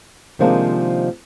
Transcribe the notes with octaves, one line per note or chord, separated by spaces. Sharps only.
C3 D#3 F3 G#3 A#3 D4